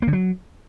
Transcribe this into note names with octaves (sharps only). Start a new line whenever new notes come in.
A#3
D3
F#3